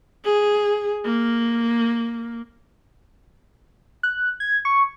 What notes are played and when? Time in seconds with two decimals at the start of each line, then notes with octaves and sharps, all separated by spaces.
0.25 G#4
1.05 A#3
4.03 F#6
4.40 G#6
4.65 C#6